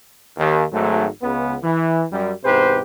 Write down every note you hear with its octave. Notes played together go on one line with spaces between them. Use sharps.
D#2
G#1 G#2 F#3 A3
C#2 C#3 B3
E3
F#2 G3
E2 G#2 C3 G4 B4 C5